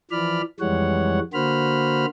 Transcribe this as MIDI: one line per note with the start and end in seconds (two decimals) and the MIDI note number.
0.11 0.41 52
0.11 0.41 53
0.11 0.41 74
0.11 0.41 83
0.11 0.41 89
0.60 1.19 41
0.60 1.19 52
0.60 1.19 55
0.60 1.19 56
0.60 1.19 73
0.60 1.19 78
1.33 2.06 50
1.33 2.06 58
1.33 2.06 66
1.33 2.06 72
1.33 2.06 83
1.33 2.06 89